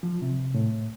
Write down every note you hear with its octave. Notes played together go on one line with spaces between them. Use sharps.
F3
C3
A2